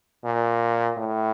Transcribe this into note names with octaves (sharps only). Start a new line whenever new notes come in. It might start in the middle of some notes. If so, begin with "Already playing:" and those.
A#2
A2